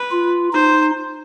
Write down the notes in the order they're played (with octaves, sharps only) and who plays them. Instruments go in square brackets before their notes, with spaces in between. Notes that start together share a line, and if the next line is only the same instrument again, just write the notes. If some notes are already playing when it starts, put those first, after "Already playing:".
Already playing: [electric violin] B4
[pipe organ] F4
[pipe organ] D#4 [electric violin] C5